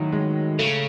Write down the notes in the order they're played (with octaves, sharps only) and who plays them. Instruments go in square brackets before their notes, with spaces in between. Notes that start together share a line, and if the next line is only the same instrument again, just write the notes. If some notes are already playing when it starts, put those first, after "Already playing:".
Already playing: [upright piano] A2 F#3 [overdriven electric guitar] D#3
[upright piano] G#3
[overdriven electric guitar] C#3 [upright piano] A3